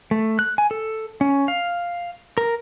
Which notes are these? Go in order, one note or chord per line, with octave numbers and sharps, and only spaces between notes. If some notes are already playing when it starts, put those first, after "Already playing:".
A3
F#6
G#5
A4
C#4
F5
A#4